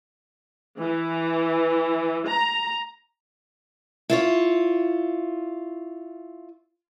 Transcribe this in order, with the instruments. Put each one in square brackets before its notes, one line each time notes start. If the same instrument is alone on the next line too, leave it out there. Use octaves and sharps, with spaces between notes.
[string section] E3
A#5
[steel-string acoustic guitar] E4 F4 C#5